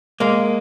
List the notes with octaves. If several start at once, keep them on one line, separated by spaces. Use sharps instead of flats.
G#3 A#3